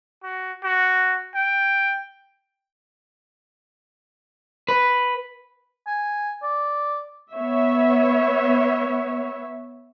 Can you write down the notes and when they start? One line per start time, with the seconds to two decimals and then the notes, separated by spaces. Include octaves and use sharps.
0.23 F#4
0.64 F#4
1.35 G5
4.69 B4
5.87 G#5
6.43 D5
7.32 B3 C#5 E5